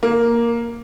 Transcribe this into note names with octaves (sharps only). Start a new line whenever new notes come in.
A#3